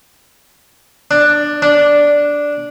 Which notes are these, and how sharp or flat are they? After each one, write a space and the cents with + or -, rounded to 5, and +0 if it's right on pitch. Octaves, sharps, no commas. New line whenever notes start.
D4 +10
D4 -5